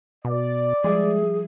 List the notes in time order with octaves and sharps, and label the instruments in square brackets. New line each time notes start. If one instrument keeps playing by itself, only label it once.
[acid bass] B2 [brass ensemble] D5
[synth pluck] F3 G3 E5 [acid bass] G#3 [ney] G#4